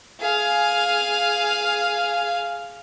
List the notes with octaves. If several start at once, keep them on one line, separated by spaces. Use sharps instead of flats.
G#4 F5